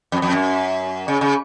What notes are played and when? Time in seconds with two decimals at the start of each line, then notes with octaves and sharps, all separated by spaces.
0.12 F2
0.22 F2
0.32 F#2
1.08 C#3
1.21 C#3